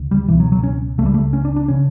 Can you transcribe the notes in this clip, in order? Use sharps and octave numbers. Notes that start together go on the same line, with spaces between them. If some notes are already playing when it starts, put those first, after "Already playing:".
Already playing: D2 C#3
G3
C#2 B2 E3
F#3
F#3
C#4
C#2 C#3 A3
G3
A3
C#4
D4
D4
C#3 C#4